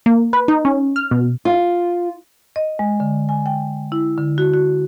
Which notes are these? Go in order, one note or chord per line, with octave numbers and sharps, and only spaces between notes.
A#3
B4
D#4
C#4
F6
B2
F4
D#5
G#3
D3
G#5
G5
E4
D3
F#4
F#4